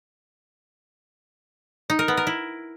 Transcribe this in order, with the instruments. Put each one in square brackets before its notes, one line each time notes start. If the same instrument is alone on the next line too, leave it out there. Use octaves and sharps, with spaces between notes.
[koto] D#4
A#4
B3
A#4
E4